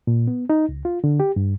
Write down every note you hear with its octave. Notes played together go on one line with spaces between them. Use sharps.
A#2
B3
D#4
C#2
F4
D3
G4
G2